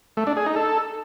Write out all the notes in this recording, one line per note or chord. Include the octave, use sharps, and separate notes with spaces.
A3
D4
G#4
D#4
A4